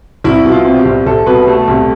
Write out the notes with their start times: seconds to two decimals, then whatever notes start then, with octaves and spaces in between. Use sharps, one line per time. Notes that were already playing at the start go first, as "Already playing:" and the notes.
0.24 C2 E4
0.45 B2
0.52 F4
0.65 C4
0.79 G4
0.85 C2
1.06 C2 A4
1.26 B2 B4
1.47 A3 A4
1.68 C2 G4